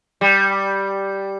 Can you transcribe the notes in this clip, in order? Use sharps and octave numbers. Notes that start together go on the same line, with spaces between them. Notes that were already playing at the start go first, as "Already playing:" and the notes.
G3